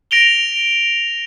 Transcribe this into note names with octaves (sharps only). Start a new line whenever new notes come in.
A#6 D7 F7 G7